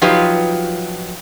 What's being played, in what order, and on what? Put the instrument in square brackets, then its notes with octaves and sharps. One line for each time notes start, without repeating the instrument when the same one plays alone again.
[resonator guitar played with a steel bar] F3 F#3 D#4 F4 G4 B4